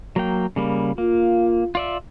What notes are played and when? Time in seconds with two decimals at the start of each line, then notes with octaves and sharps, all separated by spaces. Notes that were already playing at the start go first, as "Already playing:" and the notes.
0.16 F#3 A#3 G5
0.56 C#3 G3 A#3
0.98 A#3 F4
1.75 F4 D5 E5